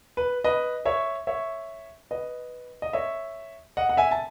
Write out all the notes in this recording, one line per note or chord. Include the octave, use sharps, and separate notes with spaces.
B4
B4 D#5
C#5 E5
C#5 E5
B4 D#5
D#5
C#5 E5
D#5 F#5
F#5
E5 G#5
A5